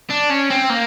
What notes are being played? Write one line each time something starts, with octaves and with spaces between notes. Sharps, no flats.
D4
C#4
C4
A#3